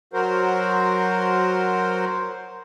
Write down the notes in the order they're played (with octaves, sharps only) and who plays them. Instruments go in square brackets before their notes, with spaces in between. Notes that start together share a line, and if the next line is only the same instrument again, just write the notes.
[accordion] F#3 F#4 A#4 C5